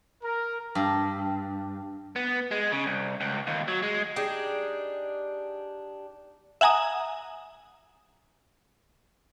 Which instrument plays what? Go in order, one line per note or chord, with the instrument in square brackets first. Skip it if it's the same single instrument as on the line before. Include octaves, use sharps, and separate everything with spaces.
[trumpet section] A#4
[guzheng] G2
[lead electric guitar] B3
G#3
C#3
C2
C#2
D#2
F#3
G#3
[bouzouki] D4 D#4 G4 G#4
[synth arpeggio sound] E5 F#5 G#5 A#5 D#6